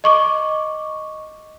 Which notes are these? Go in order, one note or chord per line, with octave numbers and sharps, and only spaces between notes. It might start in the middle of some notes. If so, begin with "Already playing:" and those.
D#5 C#6 D6